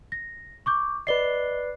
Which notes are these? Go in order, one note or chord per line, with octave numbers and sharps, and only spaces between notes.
A#6
C#6 D6 G6
B4 D5 D#5 C7 G7